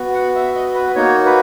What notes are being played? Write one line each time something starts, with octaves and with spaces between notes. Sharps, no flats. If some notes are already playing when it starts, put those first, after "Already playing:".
Already playing: B3 F#4
F#5
E5
D#5
B4
A#3 D#4 F#4 C#5
B4